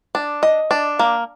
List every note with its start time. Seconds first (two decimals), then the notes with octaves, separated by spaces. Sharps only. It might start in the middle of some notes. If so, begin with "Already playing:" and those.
0.15 D4
0.43 D#5
0.71 D4
0.99 A#3